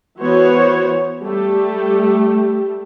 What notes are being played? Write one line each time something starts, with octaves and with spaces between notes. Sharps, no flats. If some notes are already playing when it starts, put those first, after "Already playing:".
E3 B3 F#4 C5 C#5
G3 A3 G4